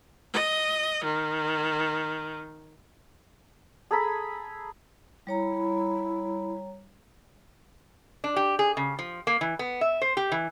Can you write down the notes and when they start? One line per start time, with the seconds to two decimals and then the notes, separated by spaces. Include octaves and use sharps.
0.33 D#5
1.04 D#3
3.91 G#4 A4 A#5 B5
5.27 G3 E4 C#5 A#5
8.24 D4
8.36 G4
8.59 G#4
8.77 C#3
8.99 F3
9.27 A#3
9.41 E3
9.59 B3
9.81 E5
10.02 C5
10.17 G4
10.32 E3